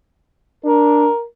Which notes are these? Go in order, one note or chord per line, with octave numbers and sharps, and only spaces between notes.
D4 A#4